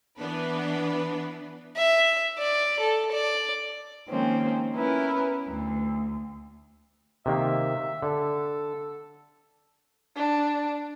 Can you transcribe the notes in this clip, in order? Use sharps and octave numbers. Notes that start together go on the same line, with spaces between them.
E3 B3 D4 B4
E5
D5
A4
D5
D#3 F3 G#3 A#3 C4 C#4
B3 C#4 E4 A#4 B4
D2
C3 D#3 A#3 E5
D3 A4
D4